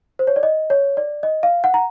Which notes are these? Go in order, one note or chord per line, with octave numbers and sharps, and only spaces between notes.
C5
C#5
D5
D#5
C#5
D5
D#5
F5
F#5
A#5